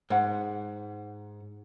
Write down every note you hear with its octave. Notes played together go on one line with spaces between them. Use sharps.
G#2 F#5